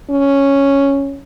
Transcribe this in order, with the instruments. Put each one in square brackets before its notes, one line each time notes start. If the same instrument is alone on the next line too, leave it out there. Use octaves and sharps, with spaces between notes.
[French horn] C#4